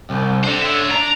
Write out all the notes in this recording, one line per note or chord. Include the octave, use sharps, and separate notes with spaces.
C2
D3 D4 G4 C5
C#5 E5
D4 A#5